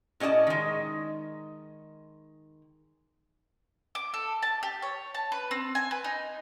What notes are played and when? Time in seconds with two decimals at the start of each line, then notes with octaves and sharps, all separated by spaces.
0.20 A2 C#4 D5 D#5 A5
0.47 D#3 G#3
3.95 D6
4.14 A4
4.42 A5
4.63 G4
4.82 C#5
5.15 A5
5.32 B4
5.51 C4
5.75 G#5
5.91 B4
6.04 D#4